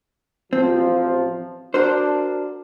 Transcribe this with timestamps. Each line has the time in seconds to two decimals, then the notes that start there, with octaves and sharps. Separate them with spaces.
0.53 A1 F3 C4
1.74 D4 F#4 A#4 C5